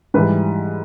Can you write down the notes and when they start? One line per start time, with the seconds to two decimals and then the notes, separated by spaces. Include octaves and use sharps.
0.14 G#2 E3 G3 B4